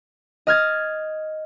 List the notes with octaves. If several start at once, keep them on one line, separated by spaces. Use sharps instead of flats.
D#5 F6 G#6 A6